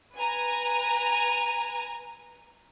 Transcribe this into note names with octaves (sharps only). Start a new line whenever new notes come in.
B4 G#5 A#5